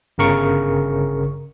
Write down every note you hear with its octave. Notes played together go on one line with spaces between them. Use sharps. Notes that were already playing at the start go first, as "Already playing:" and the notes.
G1 C#3 A#4 C#6